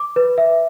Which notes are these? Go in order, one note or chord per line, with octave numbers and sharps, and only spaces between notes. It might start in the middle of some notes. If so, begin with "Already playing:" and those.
Already playing: D6
B4
E5